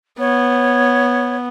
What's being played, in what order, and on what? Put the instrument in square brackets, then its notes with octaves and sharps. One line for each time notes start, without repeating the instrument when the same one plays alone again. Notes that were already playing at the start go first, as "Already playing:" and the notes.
[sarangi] B3 [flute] C#5